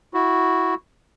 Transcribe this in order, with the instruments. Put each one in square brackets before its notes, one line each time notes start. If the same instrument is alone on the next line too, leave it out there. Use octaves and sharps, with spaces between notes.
[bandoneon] E4 F#4